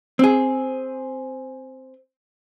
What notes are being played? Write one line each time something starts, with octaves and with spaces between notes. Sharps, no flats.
C4 G#4